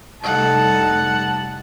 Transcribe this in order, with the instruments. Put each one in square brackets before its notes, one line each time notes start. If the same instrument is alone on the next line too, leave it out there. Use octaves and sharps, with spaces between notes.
[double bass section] F1 G3 [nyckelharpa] D#4 A4 [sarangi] F#5 [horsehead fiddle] A5